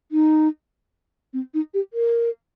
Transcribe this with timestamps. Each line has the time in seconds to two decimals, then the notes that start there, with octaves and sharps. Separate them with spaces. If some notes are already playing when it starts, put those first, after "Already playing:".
0.12 D#4
1.33 C4
1.54 D#4
1.74 G4
1.93 A#4